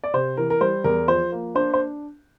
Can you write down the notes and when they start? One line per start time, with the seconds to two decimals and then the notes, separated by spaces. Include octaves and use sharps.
0.04 D5
0.14 C3 C5
0.37 E3 A#4
0.50 A#4
0.61 G3 C5
0.84 E2 A#4
1.08 F3 C5
1.32 A#3
1.55 D4 C5
1.74 C5